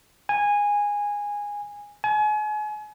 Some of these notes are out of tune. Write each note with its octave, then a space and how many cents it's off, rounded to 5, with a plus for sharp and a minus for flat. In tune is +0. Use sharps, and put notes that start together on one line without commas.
G#5 -15
G#5 +35